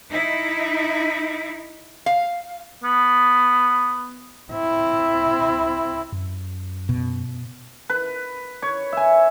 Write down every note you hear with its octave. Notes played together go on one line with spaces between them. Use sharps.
D#4 E4
F5
B3
C4 E4
F#2
B2
B4
C#5
E5 G#5